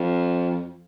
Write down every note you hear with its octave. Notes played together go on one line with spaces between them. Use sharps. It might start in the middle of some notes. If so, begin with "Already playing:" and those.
Already playing: F2